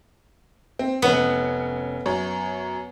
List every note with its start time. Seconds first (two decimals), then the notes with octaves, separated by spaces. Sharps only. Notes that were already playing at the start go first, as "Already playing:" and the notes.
0.79 C4
1.02 F1 B3 C#4 C#7
2.06 F#2 C#5